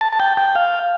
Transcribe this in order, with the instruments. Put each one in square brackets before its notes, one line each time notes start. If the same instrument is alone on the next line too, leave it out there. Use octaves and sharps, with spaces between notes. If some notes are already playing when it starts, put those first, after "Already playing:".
[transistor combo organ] A5
A5
G5
G5
F5